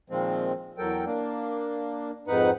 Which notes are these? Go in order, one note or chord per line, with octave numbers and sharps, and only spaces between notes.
A#2 D#3 F3 G#3 C4
E2 F#3 A4 A#4 G5
A#3 D4
F2 G#2 D#4 B4 F#5